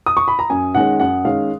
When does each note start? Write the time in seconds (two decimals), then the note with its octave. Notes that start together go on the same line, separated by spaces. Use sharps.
0.06 D#6
0.17 C#6
0.28 B5
0.39 A#5
0.50 F#2 G#5
0.75 D#3 G#3 C#4 F#5
1.00 F#2 F#5
1.24 D#3 G#3 C#4 F5